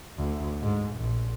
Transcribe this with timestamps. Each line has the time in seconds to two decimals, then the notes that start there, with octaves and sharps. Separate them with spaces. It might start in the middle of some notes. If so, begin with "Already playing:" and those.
0.18 D2
0.62 G#2
0.97 A#1